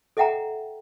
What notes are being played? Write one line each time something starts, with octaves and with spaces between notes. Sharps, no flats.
A4 D#5 E5 F#5 G5 A#5